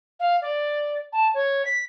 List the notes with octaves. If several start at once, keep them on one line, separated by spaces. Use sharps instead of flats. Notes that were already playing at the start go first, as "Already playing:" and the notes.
F5
D5
A5
C#5
B6